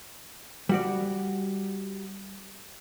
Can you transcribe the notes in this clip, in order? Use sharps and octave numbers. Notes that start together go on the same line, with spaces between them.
G3 F#4 D5